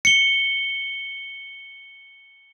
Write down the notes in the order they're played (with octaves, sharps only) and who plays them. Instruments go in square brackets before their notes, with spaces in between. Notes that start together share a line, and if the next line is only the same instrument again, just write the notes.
[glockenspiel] C#7 G7